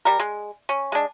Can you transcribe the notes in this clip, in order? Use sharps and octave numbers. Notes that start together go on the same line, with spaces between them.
G3 A#4
G#3
C#4
G#3 D4